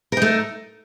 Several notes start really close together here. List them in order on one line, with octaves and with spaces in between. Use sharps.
A#4 D#4 A3